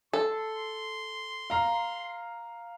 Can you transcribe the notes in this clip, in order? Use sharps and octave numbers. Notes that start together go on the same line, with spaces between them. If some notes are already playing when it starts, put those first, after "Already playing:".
A4 C6
F5 A#5